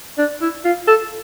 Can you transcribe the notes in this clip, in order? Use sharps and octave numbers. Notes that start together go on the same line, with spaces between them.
D4
E4
F4
A4